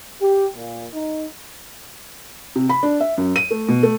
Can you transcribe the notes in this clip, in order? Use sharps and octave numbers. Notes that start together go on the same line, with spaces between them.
G4
A#2
D#4
C3
B5
D4
E5
F#2
D#7
A3
B2
A3